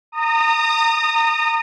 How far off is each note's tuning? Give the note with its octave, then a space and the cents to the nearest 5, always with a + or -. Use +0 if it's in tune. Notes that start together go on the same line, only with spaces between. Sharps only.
A#5 -30 D#6 -10